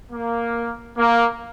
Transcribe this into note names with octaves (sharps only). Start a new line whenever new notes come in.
A#3
A#3